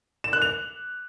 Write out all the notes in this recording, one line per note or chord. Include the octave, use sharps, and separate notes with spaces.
E7
F#6
F7